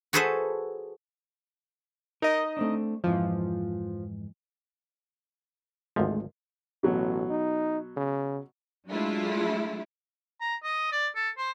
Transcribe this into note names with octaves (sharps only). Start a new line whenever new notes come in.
F#4 G#4 A4 B4 C5 E5
D#4 A#4 D#5
A3 C4 D4
F2 G#2 E3 F3
G#1 D2 F3 G#3 A3
A1 B2 F#3
D#4
C#3
F#3 G#3 A3 D4 E4 F4
A#5
D#5
D5
A4
C5